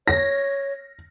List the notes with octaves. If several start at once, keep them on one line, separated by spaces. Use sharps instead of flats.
C#5 A#6